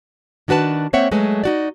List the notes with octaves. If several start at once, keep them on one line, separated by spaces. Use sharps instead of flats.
D#3 D4 F#4 B4 A5
A#3 C4 C5 C#5 E5 F#5
F#3 G#3 A3 B4
D#4 F#4 D5